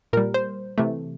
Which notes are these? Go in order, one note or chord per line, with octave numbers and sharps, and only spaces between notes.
A#2 G3 A#4
C5
C3 E3 A3